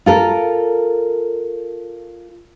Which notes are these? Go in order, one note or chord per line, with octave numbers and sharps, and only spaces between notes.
F4 A4 A#4